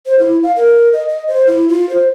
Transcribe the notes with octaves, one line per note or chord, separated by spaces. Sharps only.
C5
E4
F5
A#4
D#5
D#5
C5
E4
F4
C5